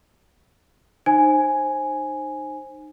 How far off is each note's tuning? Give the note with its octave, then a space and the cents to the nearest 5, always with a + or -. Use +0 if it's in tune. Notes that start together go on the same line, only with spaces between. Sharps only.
D#4 -25 C5 +20 G#5 +0